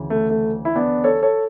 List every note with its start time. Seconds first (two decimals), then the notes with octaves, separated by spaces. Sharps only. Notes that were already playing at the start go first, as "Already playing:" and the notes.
Already playing: D2 C#3 E3
0.10 A3
0.30 A3
0.65 E4
0.76 B3 D4
1.04 A4 C#5
1.23 A4 C#5